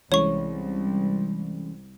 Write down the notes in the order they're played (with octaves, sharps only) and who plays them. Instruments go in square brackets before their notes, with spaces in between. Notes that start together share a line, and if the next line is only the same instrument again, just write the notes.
[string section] C2 [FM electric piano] E3 G#3 C#4 [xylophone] C#5 C#6